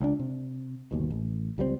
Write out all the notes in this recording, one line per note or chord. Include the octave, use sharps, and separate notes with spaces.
C#2 C#4 D4
C3
G1 D#2 B2
A1
C#2 G3 A3 C4